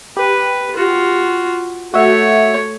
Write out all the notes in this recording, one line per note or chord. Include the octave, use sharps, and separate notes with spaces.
G4 B4
F4 F#4
A3 F#4 C#5 E5